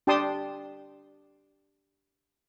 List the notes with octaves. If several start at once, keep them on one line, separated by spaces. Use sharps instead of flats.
D4 G4 G5 A5 C6 D#6